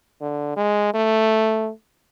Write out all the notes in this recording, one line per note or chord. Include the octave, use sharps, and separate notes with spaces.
D3
G#3
A3